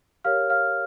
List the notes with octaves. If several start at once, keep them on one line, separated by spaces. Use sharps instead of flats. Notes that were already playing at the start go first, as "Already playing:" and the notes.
G4 A#4 C#5 F5 F6
F5 F6